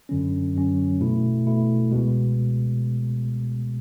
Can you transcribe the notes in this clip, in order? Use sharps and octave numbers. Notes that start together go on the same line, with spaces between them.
F#2 D3 F#3 C#4
F#2 D3 F#3 C#4
B2 A3 E4
B2 A3 E4
C#2 B2 G#3